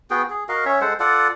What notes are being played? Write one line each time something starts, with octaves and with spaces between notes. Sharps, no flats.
B3 F#4 G#4 G5
G#4
F#4 A#4 D#5 F5
C#4 C#5 E5
G#3 A4 C5 F#5
F4 A4 D5 F#5